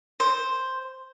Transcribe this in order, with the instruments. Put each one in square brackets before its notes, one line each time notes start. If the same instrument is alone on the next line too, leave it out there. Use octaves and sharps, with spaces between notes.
[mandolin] C5